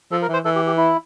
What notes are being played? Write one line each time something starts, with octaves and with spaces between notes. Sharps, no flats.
F3 A4
A#4
E3
C5
E3 A4
G4
G4
E4